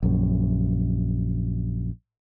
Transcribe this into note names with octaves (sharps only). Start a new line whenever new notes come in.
A#1 F#2